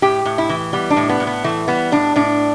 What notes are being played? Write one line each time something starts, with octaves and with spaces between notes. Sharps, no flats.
A2 G4
A2
E4
E3
G3 B3
D4
A2
B3
A2
B3
E3 A3
G3 B3
A2 D4
A2 D4